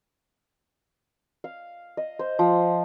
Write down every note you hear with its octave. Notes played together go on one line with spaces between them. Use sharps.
F5
D#5
C5
F3